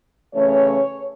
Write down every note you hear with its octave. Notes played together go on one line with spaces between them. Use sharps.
C#3 E3 A3 C#4 C#5